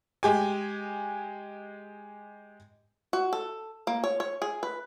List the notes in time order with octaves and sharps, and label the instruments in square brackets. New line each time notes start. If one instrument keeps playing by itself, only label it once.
[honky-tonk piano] G#3 G4 G#5
[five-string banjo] F#4
A4
A#3
C#5
C#5
G#4
B4